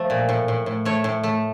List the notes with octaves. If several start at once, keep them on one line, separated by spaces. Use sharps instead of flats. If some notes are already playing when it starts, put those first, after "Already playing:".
Already playing: F3 A3
A#2
A2
A2
A2
A3 C#5
A2
A3